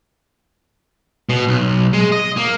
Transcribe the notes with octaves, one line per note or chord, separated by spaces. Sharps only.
B2
B1
G#3
D#5
A#3